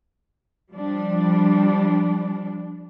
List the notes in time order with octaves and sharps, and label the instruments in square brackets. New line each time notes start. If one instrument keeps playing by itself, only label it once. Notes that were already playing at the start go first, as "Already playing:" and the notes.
[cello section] F3 G3 D4